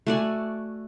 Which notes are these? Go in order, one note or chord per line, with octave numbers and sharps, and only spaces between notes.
A3 F#4 D5 G#5